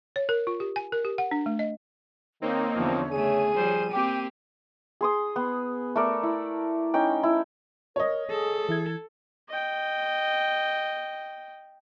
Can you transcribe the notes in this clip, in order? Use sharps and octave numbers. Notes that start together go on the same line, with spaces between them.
C#5
A#4
F4
G4
G#5
A#4
G4
F#5
D4
A3
D#5
D#3 A#3 C4 D#4 C#5
E2 D3 F3
C#3 A3 G#4 D#7
F3 G3 C5
A#3 C4 G4 G5 D6
G#4 C6 D#6
B3
A3 A#4 D5
E4
C#4 D#4 G5
E4
A#4 C#5 D#5
G#4 A4
E3 E4 G#6
D#5 G5